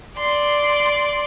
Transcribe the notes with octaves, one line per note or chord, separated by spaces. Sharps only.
D5 C6